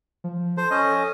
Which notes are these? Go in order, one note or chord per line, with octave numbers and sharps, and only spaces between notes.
F3
A4 C5
C#4 D#5